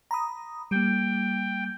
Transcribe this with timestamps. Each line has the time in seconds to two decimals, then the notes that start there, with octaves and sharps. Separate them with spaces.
0.11 A#5 B5 D#6
0.71 G3 A#3 G5